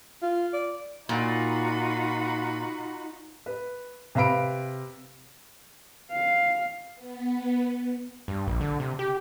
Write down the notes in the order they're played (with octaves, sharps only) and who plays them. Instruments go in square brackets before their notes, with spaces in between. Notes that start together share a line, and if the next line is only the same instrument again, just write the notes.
[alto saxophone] F4
D5
[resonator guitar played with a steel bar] A#2 [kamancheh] D#4 [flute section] F4 F#4 B5
[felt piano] B4
C3 B4 F5 B5 D7
[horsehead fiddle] F5
[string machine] B3
[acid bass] G2
A#1
D3
C3
G4